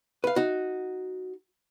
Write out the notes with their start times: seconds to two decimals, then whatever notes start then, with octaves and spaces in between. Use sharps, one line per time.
0.24 B4 F5
0.36 D#4 F#4